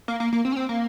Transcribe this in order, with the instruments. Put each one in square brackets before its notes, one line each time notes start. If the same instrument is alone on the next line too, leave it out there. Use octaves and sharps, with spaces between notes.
[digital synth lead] A#3
A#3
A#3
C4
C#4
C4
A#3